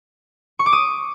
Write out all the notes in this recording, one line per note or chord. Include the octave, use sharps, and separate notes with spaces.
C#6
D6
D#6